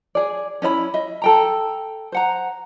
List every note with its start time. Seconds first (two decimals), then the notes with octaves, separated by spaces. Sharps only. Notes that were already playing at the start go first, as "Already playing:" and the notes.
0.15 G#4 D5
0.62 C#4 E4 D#5 B5
0.94 D#5 E5
1.22 A4 G5 A#5
2.12 C5 F#5 A#5